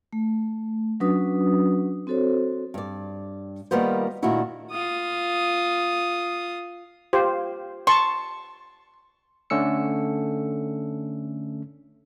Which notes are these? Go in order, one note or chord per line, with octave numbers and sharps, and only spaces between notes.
A3
F#3 C#4 D4 F#4 B4 D#6
C4 F#4 A4 C5 C#5
G2 D5
D#3 G3 A#3 B3 F4 C5
A#2 D#3 A3 D4 E4 F#4
F4 D#6
F4 G4 C5
A5 C6 C#6
D3 A3 C#4 E6 C#7